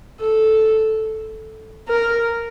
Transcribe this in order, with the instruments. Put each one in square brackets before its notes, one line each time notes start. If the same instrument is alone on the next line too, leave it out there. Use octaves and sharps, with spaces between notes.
[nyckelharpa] A4
A#4